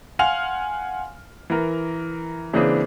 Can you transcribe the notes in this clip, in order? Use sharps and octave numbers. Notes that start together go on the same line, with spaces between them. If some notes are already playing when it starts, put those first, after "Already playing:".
F5 F#5 G#5 C6 F6 F7
E3 A#4
C#3 E3 A#3 C4 D4 G#4